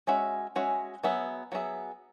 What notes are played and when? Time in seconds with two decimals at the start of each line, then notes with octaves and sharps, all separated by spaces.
0.07 G#3 C#4 F#4 E5
0.56 G#3 C#4 F#4 E5
1.03 F#3 B3 G#4 E5
1.52 F#3 B3 G#4 E5